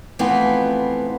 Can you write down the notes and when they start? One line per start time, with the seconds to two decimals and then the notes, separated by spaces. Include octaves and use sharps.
0.19 E3 F3 A3 B3 C4 F4